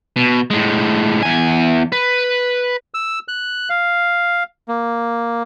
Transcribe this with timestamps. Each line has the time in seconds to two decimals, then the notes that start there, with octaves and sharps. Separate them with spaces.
0.16 B2
0.51 A2 G#3
1.23 E2 G#5
1.92 B4
2.94 E6
3.28 F#6
3.70 F5
4.68 A#3